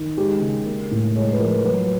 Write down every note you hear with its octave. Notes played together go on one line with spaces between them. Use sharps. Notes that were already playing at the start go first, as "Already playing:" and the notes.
Already playing: D#3
G#3 G4
C#3
A#3
A2
G#3 C#5
B4
F3 A#4
F#3 B4